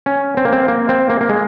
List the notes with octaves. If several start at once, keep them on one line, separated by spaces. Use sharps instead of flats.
C#4
C4
A#3
C4
A#3
C4
A#3
A#3
G#3